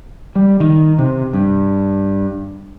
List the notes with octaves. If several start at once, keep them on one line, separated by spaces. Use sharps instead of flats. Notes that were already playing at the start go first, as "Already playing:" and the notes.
G3
D#3
C3
G2